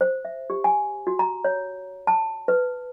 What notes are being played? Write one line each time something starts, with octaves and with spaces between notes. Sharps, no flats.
C5
E5
G4
G#5
F#4
A#5
C#5
A5
B4